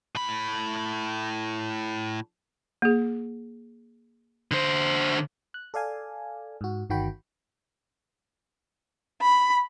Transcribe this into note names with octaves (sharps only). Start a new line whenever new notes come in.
A2 B5
A#3 G#4
D3 C5
F#6
A4 D5 F5 G#5
G#2 F#4
G1 D#3 F#4 G5 B5
B5